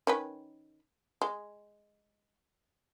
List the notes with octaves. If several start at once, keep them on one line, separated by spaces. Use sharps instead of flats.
D#3 C#4 B4
G#3